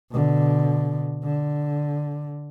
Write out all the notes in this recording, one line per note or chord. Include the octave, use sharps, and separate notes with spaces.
B2 D3
D3